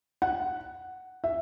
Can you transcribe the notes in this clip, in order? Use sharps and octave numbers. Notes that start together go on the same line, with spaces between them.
F#5
E5